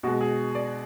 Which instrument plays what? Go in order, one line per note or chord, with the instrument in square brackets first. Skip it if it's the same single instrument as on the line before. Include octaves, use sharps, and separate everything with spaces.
[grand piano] B2 G#3 F#4
G#4
D5